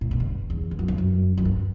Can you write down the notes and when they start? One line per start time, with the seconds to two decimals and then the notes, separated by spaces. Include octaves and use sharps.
0.01 A2
0.11 B2
0.20 G2
0.50 E2
0.71 E2
0.79 F#2
0.88 G2
0.98 F#2
1.38 F#2
1.45 G2